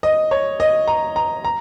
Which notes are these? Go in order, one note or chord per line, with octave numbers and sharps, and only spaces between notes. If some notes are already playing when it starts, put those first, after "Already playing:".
D#5
C#5
D#5
A#5
A#5
A#5